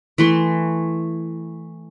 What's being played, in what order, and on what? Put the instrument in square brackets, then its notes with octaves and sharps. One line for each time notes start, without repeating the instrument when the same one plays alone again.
[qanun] E3 A3 C6